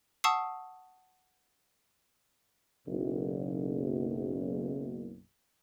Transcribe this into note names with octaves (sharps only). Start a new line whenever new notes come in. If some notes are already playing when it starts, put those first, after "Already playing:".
F#5 A5 C#6 D#6 E6 C7
F#1 B1